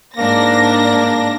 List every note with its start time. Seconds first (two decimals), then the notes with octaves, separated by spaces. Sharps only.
0.17 G#2 A#3 D4 A#6